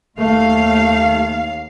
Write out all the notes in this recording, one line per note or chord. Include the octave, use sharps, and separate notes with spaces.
D#2 A3 F5